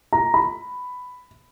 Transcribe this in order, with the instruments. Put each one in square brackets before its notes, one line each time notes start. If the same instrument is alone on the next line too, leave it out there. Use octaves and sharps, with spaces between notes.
[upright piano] A#5
B5